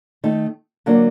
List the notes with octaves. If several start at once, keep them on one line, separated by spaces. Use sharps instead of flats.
D#3 A3 D#4
D3 F#3 A#3 D4